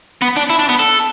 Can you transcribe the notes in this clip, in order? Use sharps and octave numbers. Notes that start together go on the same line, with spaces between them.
B3
D4
E4
D4
B3
A4